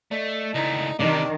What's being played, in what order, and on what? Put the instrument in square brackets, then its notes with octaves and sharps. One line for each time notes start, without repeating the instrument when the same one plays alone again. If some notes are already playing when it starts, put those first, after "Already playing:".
[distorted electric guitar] A3 [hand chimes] D5 D#5
[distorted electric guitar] C#2 A3 [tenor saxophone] D#4 [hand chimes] E4 D5 A#5
[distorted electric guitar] C3 G3 [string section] D#3 [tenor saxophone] D4 [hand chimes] D#5